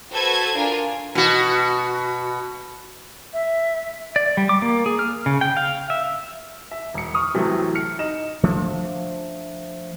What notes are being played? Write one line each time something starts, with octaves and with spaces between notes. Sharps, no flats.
F#4 A4 B4 C5 G#6
D4 F4 A#4 G#5
B2 F#4
E5
D5
G3
D6
A#3
G#4
F6
C#3
G5
F5
E5
E5
E1 C#7
C#6 D#6 F6
A2 C3 E3 F#3 A3
F6 C#7
D#4 D#5 E7
F3 A3 D4